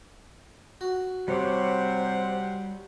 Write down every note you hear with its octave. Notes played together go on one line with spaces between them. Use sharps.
F#4
C3 G3 C5 C#5 F#5 D6